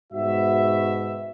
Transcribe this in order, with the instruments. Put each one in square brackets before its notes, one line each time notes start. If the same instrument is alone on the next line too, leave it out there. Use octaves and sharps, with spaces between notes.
[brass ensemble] G#2 B2 F#4 E5